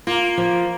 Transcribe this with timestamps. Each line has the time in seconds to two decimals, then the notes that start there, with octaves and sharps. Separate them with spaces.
0.07 A#3 F4
0.38 F3